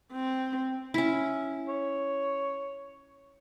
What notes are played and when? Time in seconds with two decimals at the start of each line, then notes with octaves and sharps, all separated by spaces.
0.13 C4
0.94 C#4 E4
1.69 C#5